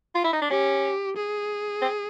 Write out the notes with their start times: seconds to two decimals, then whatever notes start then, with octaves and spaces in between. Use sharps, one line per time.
0.15 F4
0.24 E4
0.33 D#4
0.42 D4
0.50 C#4 G4
1.16 G#4
1.82 C4